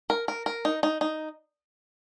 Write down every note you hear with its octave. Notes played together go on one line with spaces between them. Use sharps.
A#4
A#4
A#4
D#4
D#4
D#4